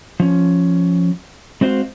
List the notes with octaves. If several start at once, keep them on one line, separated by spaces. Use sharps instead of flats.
F3 C#4
G#3 C4 F#4 C5 F5